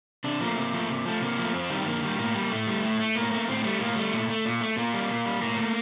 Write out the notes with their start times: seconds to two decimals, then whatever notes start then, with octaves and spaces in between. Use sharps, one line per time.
0.24 C3 D4
0.41 F3 A3 A#3
0.56 C3
0.73 F3 A3
0.89 C3
1.06 F3 A3
1.21 C3 A#3
1.38 F3 A3
1.54 F2 C4
1.70 D#3 G3
1.86 F2 A#3
2.03 D#3 G3
2.18 A2 A#3
2.35 G3
2.41 A#3
2.51 A2 A3
2.67 G3
2.83 A2
3.00 A3
3.16 A2 A#3
3.32 A3 A#3
3.48 A2 C4
3.64 G3 A3
3.80 A2 A#3
3.96 G3 A3
4.12 A#2
4.30 A3
4.45 A#2
4.61 A3
4.77 A#2 A#3
4.94 G3
5.10 A#2
5.26 G3
5.42 A2 A#3
5.58 A3